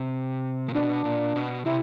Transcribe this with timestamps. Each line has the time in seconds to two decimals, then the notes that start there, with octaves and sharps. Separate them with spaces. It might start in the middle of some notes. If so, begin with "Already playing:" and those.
Already playing: C3
0.69 A#2
0.74 B2 D4
1.05 A#2
1.36 B2
1.66 C3 E4